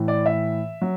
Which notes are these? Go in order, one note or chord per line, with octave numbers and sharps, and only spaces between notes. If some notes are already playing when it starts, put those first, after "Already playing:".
Already playing: A2 E3
D5
E5
F#3